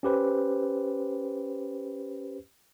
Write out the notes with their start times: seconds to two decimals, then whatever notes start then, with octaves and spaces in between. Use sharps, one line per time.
0.03 C#4 G4 B4 C5